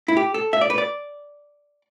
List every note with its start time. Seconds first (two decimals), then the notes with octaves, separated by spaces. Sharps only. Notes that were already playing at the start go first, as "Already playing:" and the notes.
0.08 E4
0.17 G4
0.34 A4
0.53 E5
0.61 D5
0.70 B4
0.78 D5